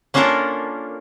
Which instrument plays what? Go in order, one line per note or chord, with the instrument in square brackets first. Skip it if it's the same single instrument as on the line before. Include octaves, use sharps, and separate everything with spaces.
[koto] A#3 C#4 D4 F4 A4 A#4